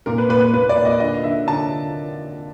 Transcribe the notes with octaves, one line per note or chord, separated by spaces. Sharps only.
A#2 A#4
B4
A#2 B4
B4
A#2 B4
D5
A#2
D#5
D3 D#5
D3 E5
D3 A5